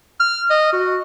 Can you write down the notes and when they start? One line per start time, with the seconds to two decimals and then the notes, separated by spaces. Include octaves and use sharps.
0.20 F6
0.50 D#5
0.73 F#4